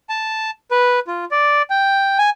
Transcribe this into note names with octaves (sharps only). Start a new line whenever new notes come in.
A5
B4
F4
D5
G5
G#5